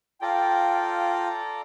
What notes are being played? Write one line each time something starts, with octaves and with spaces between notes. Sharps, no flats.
F4 A4 D5 F5 G5 A#5